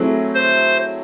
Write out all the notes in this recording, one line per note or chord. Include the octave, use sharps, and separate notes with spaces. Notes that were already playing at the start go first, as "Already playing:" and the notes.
Already playing: F#3 A3 C4 E4 G#4
C5